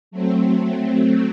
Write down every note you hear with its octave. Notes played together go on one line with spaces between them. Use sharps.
F#3 A3 C4